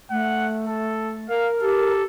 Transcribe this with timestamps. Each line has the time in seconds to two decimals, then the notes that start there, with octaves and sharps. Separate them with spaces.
0.11 A3 F#5
0.67 A4
1.29 A#4 F5
1.61 G4 A4